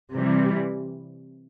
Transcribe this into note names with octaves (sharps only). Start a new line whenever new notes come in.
C3 E3 G3